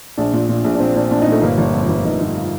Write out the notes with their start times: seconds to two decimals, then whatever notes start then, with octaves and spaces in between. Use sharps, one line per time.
0.17 A#1 D4
0.33 A#2
0.49 A#2
0.64 A#1
0.75 D4
0.80 A#2 C4
0.96 A#2 D4
1.11 A#2 D4
1.22 D#4
1.27 A#2 A3
1.42 G1 A#3
1.58 G1 D4
1.73 F2
1.89 G1
2.05 G1 D#4
2.20 G1
2.35 F4